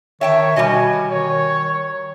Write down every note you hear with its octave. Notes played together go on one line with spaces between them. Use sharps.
D#3 C#5 E5 G5 A5
B2 G3 F#4 D#5 G#5
D#3 C#5